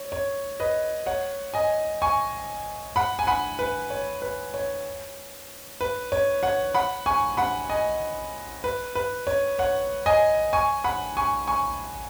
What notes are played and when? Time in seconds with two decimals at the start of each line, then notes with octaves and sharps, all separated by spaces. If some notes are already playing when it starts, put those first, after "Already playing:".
Already playing: C#5
0.12 C#5
0.60 B4 D#5
1.06 C#5 F#5
1.54 D#5 G#5
2.02 G#5 C#6
2.96 F#5 B5
3.19 G#5
3.27 F#5 B5
3.59 B4
3.90 C#5
4.22 B4
4.54 C#5
5.81 B4
6.12 C#5
6.43 C#5 F#5
6.75 F#5 B5
7.06 G#5 C#6
7.37 F#5 B5
7.69 D#5 G#5
8.64 B4
8.95 B4
9.27 C#5
9.59 C#5 F#5
10.06 D#5 G#5
10.53 G#5 C#6
10.84 F#5 B5
11.17 G#5 C#6
11.48 G#5 C#6